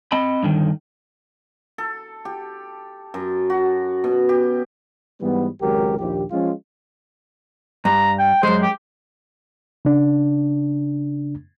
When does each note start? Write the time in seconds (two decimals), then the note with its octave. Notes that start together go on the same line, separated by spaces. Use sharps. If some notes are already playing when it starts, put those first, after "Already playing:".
0.12 C4 D#5 B5
0.43 G2 D3 D#3
1.78 A4
2.25 G4
3.14 F#2
3.50 F#4
4.04 B2
4.29 G4
5.21 G#2 E3 G3 B3
5.61 G#1 C#2 G#2 F#3 G4 A#4
5.98 A#1 D#2 G4
6.30 F3 G#3 C#4 F4
7.85 G2 A#5
8.19 G5
8.43 F#2 G#3 C5
8.62 G4
9.85 C#3 D4